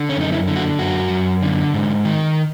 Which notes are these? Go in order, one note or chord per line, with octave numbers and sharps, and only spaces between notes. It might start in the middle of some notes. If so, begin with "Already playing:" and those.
Already playing: D3
C#4
F#2 D#4
E4
D3
F#4
F#2 F#4
F#2
D3
G#2
D#3